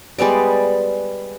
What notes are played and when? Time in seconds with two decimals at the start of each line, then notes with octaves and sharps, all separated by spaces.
0.18 G3 G#3 B3 D5